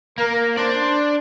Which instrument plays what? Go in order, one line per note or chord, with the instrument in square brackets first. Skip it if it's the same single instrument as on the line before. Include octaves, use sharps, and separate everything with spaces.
[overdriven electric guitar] A#3 [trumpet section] A#4
[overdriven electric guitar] D4 D5 [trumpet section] C5